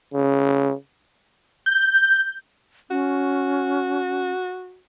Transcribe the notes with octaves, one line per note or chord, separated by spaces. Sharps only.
C#3
G6
C#4 F#4